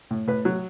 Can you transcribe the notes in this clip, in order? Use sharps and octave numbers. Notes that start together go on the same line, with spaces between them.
A2
A2 B4
F#3